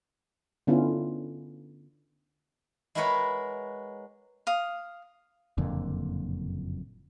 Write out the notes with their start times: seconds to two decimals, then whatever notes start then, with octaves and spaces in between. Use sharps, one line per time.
0.67 D3 B3 C#4 E4 F4
2.95 G#3 E4 F#4 A#4 B4 C#5
4.47 F5 D#6
5.58 F#1 F2 A#2 D3